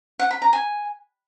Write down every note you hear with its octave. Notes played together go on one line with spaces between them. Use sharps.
F#5
B5
A#5
G#5